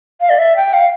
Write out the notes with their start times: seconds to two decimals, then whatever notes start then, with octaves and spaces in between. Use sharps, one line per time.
0.21 F5
0.30 D5
0.39 E5
0.56 G5
0.74 F5